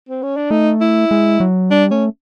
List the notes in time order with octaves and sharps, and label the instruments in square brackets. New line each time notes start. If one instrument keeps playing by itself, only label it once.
[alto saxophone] C4
C#4
D4
[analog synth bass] A3 [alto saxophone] D#4
[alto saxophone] E4
[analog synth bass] G#3
F#3
[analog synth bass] G3 [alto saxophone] D4
[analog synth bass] A3 [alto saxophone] C#4